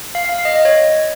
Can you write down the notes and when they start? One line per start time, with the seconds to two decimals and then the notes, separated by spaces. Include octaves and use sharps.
0.15 F5
0.29 F5
0.45 D#5
0.56 D#5
0.65 C#5